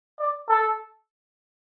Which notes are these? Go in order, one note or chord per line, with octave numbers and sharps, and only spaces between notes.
D5
A4